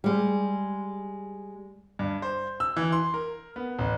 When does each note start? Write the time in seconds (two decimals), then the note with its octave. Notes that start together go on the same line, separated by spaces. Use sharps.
0.04 G3 G#3
1.99 G2
2.22 C5
2.60 E6
2.77 E3
2.92 C6
3.14 A#4
3.56 B3
3.79 A1